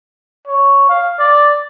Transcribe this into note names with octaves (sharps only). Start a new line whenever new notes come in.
C#5
F5
D5